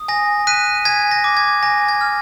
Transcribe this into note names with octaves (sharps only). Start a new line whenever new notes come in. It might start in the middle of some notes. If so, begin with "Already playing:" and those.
Already playing: D#6
G#5 A#6
F#6 B6 D#7
G#5 G#6 B6
A#6
D6
G#6
G#5 A#6
G#6
F6